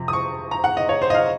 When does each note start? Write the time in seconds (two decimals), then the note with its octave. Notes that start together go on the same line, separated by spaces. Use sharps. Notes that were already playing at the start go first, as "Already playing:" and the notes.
Already playing: F2 C3 F3
0.08 D#6
0.13 C#6
0.51 A#5
0.64 F#5
0.77 D#5
0.89 C#5
1.02 C5
1.10 D#5
1.14 F5